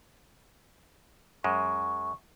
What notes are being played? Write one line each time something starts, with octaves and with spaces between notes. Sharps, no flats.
F#2 G#3 C#6